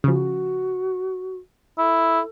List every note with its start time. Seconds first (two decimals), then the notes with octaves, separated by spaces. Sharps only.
0.04 C#3 F3 F#4
1.78 E4 A4